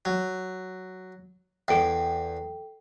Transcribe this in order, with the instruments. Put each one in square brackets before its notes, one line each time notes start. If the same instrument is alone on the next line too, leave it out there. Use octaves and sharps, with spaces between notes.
[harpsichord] F#3
[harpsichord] E2 [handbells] A4 G5